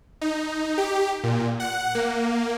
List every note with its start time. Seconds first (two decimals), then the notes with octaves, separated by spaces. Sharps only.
0.21 D#4
0.78 G4
1.23 A#2
1.60 F#5
1.95 A#3